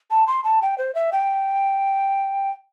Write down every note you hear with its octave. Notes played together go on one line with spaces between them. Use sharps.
A5
C6
A5
G5
C5
E5
G5